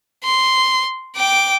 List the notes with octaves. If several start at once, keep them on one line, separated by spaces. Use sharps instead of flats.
C6
G5 D6